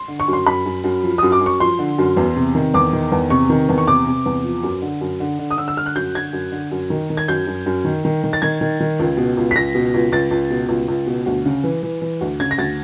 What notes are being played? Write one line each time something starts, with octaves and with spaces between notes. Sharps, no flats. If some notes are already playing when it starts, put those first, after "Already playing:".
Already playing: C6
D3
C#6
F#2 C6
F#2 B5
F#2
F#2
F3
F#2 D#6
D6
F#2
C#6
F3 C6
D3
F#2
E2
C3
D#3
E2 D6
D#3
E2
C3 C#6
D#3
E2
C#6
C3 D6
C3
E2
F3
F#2
D3
F#2
D3
D3
D#6
D3 E6
E6
D3 F6
F#6
F#2 G6
D3 G#6
F#2
D3
F#2
D#3
D#3
G#6
F#2 G6
F#2
F#2
D#3
D#3
D#3
A6
D#3 G#6
D#3
D#3
C#2
B2
C#2
B6
C#2 A#6
B2
C#2
C#2 A6
C#2
B2
C#2
C#2
B2
D2
C#3
E3
E3
E3
D2
C#3 G#6
A#6
D2 A6